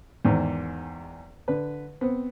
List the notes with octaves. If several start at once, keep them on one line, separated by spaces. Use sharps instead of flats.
E2 G#2 D#3
D3 B4
B3 C4